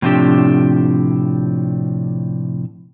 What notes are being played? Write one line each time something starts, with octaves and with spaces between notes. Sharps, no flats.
A2 C3 F3 C4 D4 G4